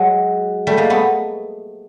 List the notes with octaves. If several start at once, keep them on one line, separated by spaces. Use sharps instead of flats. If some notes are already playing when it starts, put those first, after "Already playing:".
Already playing: F#3 G#3
G3 A3
G#3 A#3
A3 B3